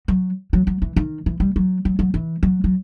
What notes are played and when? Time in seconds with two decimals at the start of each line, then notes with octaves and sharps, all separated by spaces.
0.08 F#3
0.53 F#3
0.67 F#3
0.82 E3
0.96 D#3
1.26 E3
1.40 G3
1.56 F#3
1.85 F#3
1.99 F#3
2.14 E3
2.43 F#3
2.64 F#3